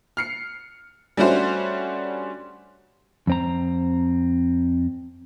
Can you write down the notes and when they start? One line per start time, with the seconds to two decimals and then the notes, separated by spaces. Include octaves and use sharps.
0.17 F6 C7 C#7
1.17 G3 A3 C#4 D4 F#4 C5
3.27 F2 C4 A#5